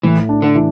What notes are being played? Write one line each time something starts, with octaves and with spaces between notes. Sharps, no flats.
A2 E3
D4
D3
E3